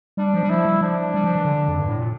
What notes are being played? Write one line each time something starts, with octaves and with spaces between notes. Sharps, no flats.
G3 D4
F3
G3
F3 E4
G3
F3 D4
G3
F3
E3
D3
F2
G2
A2
A#2